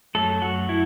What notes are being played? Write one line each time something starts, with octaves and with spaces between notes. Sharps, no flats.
F#2 F#3 A3 A4
F#4
E4